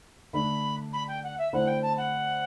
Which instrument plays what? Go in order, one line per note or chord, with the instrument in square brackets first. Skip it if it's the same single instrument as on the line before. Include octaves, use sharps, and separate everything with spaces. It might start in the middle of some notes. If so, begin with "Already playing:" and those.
[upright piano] D3 A3 D4 [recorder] B5
[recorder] B5
G5
F#5
E5
[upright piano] D3 A3 C4 E4 [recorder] F#5
[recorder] G5
A5
F#5